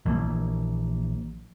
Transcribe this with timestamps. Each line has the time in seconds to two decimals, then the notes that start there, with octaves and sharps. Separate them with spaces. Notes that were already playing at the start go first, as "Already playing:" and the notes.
0.05 A#1 E3 A#3